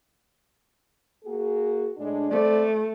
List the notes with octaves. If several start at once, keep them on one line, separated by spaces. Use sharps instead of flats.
A#3 F#4 G#4
A2 G#3 D4
A3 C4 C5 D5